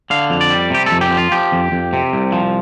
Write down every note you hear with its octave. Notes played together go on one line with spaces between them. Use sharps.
D3 F5
F2
D5
G3
C3 G4
F2 A4
G4
F3
F4
F3 G4
F2
F2
C3
C2
F3